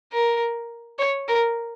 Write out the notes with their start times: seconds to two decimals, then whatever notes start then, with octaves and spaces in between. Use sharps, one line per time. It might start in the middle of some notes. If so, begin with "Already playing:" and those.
0.13 A#4
0.99 C#5
1.28 A#4